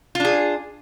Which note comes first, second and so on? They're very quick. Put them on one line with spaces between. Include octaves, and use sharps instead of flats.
F4 D4 G#4